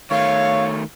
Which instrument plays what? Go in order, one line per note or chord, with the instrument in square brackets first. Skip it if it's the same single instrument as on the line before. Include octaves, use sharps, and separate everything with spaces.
[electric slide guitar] D#3 A3 [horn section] C#5 [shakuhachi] F5